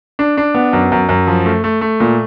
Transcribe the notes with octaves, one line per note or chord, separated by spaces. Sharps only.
D4
D4
B3
F#2
F#2
F#2
F3
A3
A3
A3
A#2